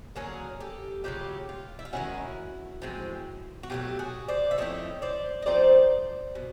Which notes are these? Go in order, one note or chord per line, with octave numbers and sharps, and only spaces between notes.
D3 F#3 A#3 C#4 G#4 A#4
G4 A4
C#3 F#3 A3 F4 G4
F4
E4
F4
D#3 G#3 C#4 E4 F#4
A2 F3 G#3 C4
F#4
B2 F#3 A3 F4 G4
F#4 G#4
C5 D5
E5
F3 A3 C4 E4 C#5 D#5
C5 D5
D#5
F3 A3 C4 D#4 C5 D5
B2